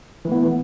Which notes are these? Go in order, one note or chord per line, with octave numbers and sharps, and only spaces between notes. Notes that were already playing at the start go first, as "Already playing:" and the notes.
E3 A3 B3